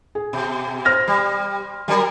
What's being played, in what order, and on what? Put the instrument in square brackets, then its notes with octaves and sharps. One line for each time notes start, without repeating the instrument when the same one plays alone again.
[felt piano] G#4
[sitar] B2
[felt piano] C5 F6 A#6
[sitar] G3
F#3 G3 A#4